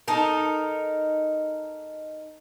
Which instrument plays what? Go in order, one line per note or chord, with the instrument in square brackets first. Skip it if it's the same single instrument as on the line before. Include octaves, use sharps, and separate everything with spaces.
[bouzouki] D#4 A4 A#4